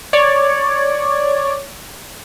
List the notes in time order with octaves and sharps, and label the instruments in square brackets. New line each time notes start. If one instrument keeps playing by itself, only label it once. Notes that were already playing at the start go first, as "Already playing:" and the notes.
[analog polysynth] C#5 D5